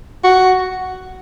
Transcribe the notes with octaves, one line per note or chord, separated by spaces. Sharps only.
F#4